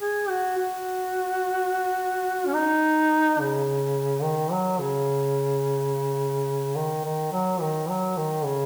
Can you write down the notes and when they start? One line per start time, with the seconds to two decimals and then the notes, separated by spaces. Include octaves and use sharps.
0.01 G#4
0.30 F#4
0.58 F#4
2.46 C#4
2.55 D#4
3.40 C#3
4.23 D#3
4.52 F#3
4.80 C#3
6.76 D#3
7.05 D#3
7.32 F#3
7.61 D#3
7.89 F#3
8.17 D#3
8.45 C#3